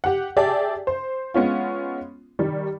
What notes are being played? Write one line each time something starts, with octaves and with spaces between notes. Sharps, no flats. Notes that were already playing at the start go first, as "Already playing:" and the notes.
G4 F#5
G4 G#4 D5 E5 G5 A5
C5
G#3 B3 C#4 F4
D#3 G3